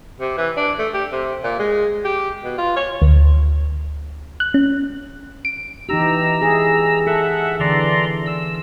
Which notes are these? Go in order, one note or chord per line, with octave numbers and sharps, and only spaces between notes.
C3
E3
D4
A3
G4
C3
A#2
G#3
G4
B2
F4
C#5
D2
F#6
C#4
D7
E3 D#4 G4 A#5 E6
E4 G#4
A4 E5 F#5
D3 E3 D5 A#5 C6
E6